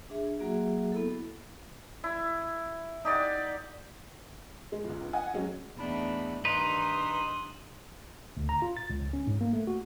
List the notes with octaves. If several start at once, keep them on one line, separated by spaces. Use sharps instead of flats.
D4 G#4 E5
F#3 A#3 F#4 G#4 E5
B3 E4 A4
E4
D#4 G4 D5 F#5
G#3
G1 C#2
D#5 F#5 G#5
F#3 G#3 C#4
E2 A3 D4 D#4 B5
G2 D#3 D#4 B4 C6 D#6 E6 F#6
D2
A#5
F4
A6
C#2
C#4
G#2
A#3
A3
F#4